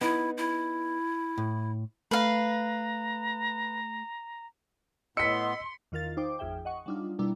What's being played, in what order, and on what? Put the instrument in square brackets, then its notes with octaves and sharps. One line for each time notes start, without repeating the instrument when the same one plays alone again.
[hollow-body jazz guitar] B3 D#4 [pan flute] E4
[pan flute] E4
[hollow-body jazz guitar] A2
[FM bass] A3 [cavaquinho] B4 F5 [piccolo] A#5
[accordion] A2 B3 [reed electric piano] D#5 E6 [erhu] C6 [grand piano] B6 C#7
[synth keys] E2 D#3 F4 A#4 F5 A6
D#4 C5 G5 D6
A1 F2 G#4 E5 G5
D#5 F#5 C#6
F#3 G3 D4 D#4 F4
B2 G3 A#3 D4 E4